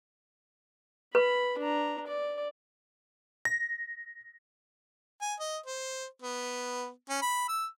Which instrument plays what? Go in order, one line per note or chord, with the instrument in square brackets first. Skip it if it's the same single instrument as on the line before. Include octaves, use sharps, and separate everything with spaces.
[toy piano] B4 [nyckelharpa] B5
[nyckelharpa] D4 A#5
D5
[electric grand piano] A#6
[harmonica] G#5
D#5
C5
B3
C#4
B5
E6